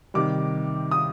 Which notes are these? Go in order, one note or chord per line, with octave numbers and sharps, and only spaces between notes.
C3 D#3 G3 D6
D#6